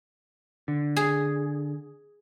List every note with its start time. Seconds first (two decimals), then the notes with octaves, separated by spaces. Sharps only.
0.68 D3
0.96 G#4